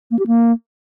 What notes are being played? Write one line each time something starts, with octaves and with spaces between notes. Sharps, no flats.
A#3
G4
A#3